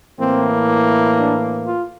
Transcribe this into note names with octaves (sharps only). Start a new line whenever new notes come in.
A2 E3 A#3 C4
D4
F4